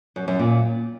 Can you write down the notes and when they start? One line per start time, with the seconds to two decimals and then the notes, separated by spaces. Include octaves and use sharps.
0.16 F#2
0.28 F#2
0.39 A#2